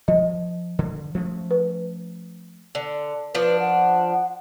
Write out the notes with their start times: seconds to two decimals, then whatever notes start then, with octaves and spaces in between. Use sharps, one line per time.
0.08 F3 D#5
0.79 D3
1.14 F3 A3 C#4
1.51 B4
2.75 D3
3.35 F3 D4 B4
3.60 F#5